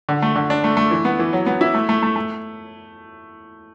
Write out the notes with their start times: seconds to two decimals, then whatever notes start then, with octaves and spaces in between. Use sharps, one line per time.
0.09 D3
0.22 A3
0.35 D3
0.50 D4
0.64 A3
0.77 A3
0.91 E3
1.05 B3
1.19 E3
1.33 F#3
1.46 B3
1.61 E4
1.74 A3
1.89 A3
2.03 A3
2.16 A3